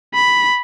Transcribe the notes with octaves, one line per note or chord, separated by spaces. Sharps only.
B5